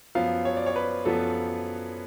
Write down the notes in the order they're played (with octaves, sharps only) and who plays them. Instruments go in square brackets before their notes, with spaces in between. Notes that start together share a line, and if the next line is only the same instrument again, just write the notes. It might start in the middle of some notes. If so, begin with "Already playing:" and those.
[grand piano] F#2 F3 B3 F5
C#5
D5
C#5
B4
F#2 F3 B3 A4